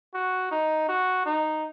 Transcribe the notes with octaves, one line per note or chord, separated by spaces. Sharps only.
F#4
D#4
F#4
D#4